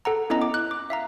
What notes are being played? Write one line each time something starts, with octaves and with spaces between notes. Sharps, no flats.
A4 F#5 A#5
B3 C#4 E4 D#5 A#5
D6
F#6
D6
E5 F5 A#5